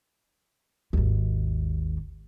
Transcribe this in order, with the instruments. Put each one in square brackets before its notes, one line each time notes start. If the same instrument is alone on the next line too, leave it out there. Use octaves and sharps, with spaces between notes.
[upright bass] G#1 D#2